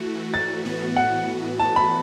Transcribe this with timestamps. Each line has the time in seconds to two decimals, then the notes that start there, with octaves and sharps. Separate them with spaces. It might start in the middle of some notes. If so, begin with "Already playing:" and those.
Already playing: E3 A3 F#4
0.34 A6
0.65 A2 E3 B3 F#4
0.96 F#5
1.60 A5
1.76 B5